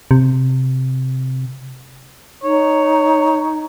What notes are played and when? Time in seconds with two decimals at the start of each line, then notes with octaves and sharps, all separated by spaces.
0.11 C3
2.43 D#4 C#5